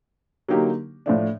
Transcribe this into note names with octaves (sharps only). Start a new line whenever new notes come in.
D3 F#3 A#3 D#4 G4
A2 F3 A3 D4